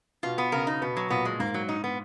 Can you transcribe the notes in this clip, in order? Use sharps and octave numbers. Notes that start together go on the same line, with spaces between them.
B2 F4
B3
C#3 A#4
D#4
B2 B3
F#3
A#2 B3
G#3
G#2 A#3
F#3
D#4
B3